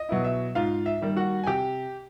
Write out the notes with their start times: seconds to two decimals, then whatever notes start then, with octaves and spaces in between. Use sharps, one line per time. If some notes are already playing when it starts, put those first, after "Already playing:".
Already playing: D#5
0.09 B2 F#3 B3 E4
0.24 E5
0.55 G#2 F4 F5
0.86 E5
1.01 D#3 G3 A#3
1.17 F#4 F#5
1.44 G#5
1.47 C3 G4 G5